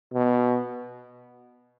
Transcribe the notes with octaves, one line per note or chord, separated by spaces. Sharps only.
B2